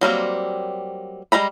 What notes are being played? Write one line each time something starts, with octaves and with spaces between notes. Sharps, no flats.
F#3 G3 A#3 C4
G3 G#3 A#5 B5